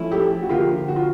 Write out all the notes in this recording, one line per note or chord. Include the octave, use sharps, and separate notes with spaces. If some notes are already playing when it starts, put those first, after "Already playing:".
Already playing: F3 A3 C#4 E4
G4 A4
F#4
D3 F3 A#3 F4 G4
F#4
F4